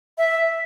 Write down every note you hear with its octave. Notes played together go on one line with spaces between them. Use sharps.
E5